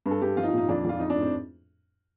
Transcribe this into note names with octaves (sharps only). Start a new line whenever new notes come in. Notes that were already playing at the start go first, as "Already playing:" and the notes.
G2
A4
G2 G4
F3 F4
D#4
F4
A#2 D#4
F2 D4
F2 F4
F3 D#4
D4
A2
C4